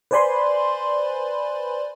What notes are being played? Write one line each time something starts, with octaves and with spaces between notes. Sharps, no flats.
B4 C5 D5 G#5 B5 C6